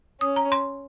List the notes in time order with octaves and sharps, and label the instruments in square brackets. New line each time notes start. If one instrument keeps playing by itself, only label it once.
[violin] C#4 [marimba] D#6
[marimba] A#5
C6